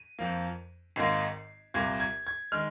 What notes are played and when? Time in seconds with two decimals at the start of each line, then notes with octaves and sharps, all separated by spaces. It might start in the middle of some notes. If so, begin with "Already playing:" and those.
Already playing: D#7
0.19 F2 F3 A#3
0.96 G#1 G#2 D#3 A#3 C7
1.74 C2 A#2 A#3 G#6
2.00 G#6
2.27 G#6
2.52 D#3 G#3 F6